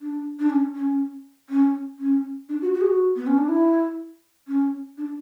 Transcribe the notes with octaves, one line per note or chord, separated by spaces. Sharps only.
D4
D4
C#4
C#4
C#4
C#4
D4
F#4
F#4
G#4
F#4
B3
C#4
D4
E4
C#4
D4